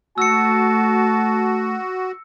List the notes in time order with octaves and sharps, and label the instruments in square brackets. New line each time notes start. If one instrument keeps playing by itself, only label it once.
[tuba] A3 [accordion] F#4 [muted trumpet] A5 [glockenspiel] E6 C#7